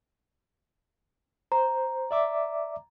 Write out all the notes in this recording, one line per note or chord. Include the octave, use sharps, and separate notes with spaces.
C5 A#5
D5 E5 D6